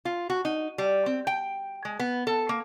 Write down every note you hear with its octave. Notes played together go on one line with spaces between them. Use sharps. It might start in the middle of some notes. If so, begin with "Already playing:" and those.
F4
F#4
D#4
G3
C4
G5
G#3
B3
A4
A#3